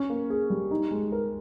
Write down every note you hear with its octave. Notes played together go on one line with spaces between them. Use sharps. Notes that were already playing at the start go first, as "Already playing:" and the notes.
Already playing: C#4
A#3
G#4
G3
D#4
G#3
A#4